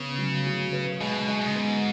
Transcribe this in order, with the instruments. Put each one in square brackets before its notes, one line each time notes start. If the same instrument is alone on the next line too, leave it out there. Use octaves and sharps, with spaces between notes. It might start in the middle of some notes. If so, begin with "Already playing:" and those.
Already playing: [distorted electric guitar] C#3 [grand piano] B3
[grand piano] F#3
F#3
B4
[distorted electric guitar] B2 [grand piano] G#3
[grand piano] G#3
[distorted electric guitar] G#2
[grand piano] B3